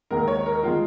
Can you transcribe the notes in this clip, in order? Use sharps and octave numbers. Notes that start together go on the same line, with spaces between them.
D#2 D#3 G#3 A#4
C#5
A#4
D#3 G#3 F4